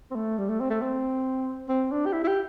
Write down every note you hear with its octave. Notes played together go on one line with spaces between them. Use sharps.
C4
A3
G3
A3
C4
A3
C4
C4
D4
G4
E4
E4
G4